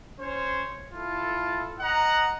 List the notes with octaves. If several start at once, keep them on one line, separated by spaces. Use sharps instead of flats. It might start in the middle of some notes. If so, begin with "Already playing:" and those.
C#4 C5 C#5
E4 F4 A4
D#5 F#5 A#5